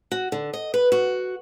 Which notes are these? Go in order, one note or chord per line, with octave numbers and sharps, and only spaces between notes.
F#4
D3
D#5
B4
F#4